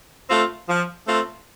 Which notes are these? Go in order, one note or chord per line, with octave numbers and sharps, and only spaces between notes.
A3 C4 F4
F3
A3 C4 F4